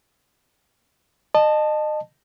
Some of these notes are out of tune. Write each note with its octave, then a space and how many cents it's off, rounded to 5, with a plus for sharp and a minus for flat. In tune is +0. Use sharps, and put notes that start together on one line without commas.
D#5 -30 A5 +0